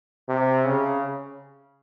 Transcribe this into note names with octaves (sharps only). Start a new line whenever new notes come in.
C3
C#3